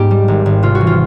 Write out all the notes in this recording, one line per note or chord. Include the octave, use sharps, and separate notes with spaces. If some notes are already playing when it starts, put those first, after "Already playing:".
Already playing: G#2 B3 G4
G3
G#1
G#1
C3 F4
F#4
E3
F4